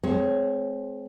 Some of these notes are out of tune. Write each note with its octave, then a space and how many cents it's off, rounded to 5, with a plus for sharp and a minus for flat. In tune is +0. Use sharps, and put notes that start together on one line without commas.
G#3 +30 C4 -10 C#5 +5